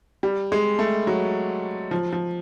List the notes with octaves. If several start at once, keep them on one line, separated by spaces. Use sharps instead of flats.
G3
G#3
A3
F#3
F3
F3